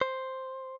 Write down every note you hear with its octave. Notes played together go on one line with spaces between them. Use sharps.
C5